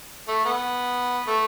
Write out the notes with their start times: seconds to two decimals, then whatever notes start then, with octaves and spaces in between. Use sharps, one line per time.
0.28 A3
0.45 B3
1.27 A3